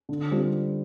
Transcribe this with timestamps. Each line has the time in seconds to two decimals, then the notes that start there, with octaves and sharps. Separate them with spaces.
0.09 D3
0.31 G3 C4 F4